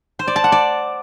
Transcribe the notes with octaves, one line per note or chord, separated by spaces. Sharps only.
C5
D5
A5
F#5
D5